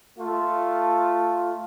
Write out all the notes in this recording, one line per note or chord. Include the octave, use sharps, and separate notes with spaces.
A3 F4